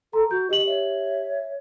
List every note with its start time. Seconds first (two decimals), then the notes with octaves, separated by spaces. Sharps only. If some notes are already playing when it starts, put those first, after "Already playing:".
0.13 A4 A#5 C6
0.31 F#4 G6
0.50 G4 D#5 F#7
0.66 C#5 E5